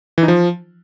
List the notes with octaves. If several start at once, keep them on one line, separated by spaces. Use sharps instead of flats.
E3
D#4
F3